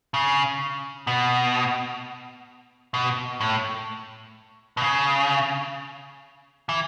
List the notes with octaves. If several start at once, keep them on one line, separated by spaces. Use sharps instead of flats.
C#3
B2
B2
A2
B2
C#3
E3